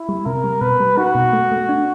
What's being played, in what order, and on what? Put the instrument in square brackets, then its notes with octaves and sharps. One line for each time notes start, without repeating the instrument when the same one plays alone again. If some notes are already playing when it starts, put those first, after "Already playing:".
Already playing: [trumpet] E4
[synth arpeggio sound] G3
[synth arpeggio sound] C3 [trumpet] A#4
[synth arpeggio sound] G3
[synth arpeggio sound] B2 [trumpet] B4
[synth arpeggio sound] G3
[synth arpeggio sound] D#4 [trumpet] F#4
[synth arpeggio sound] B2
A3
A3
D4